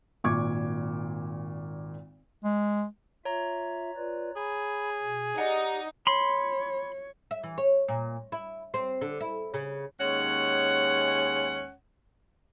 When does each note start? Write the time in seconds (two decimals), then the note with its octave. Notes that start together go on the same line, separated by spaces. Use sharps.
0.24 G#1 A#2 C#6 D6 G#6
2.44 G#3
3.25 F4 C#5 E5 A#5
3.96 F4 B4 D5
4.36 G#4 B5
5.02 B2
5.38 D#4 G4 D5 F#5
6.07 C#5 B5 C6
7.31 E5
7.43 E3
7.58 C#5
7.88 A#2
8.32 E4
8.74 C4
9.01 D3
9.20 E4
9.54 C#3
10.01 D#2 G#3 C#4 C#5 F#5